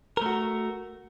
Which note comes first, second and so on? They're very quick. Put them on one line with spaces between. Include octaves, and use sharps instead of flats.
A#4 A3 F#4